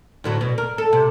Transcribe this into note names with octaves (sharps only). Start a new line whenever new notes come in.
D2 A2 F#3
B2
A#4
A4
C3